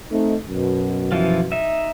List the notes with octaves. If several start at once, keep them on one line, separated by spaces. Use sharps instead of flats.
A3 C4 D#4
F#2 B2
E3 F3 F4
D#4 E5